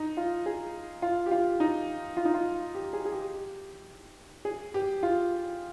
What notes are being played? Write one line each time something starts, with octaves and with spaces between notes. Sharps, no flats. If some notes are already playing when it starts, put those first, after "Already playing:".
Already playing: D#4
F4
G#4
F4
G4
F4
D#4
F4
D#4
F4
G4
G#4
G#4
G4
G#4
G4
F4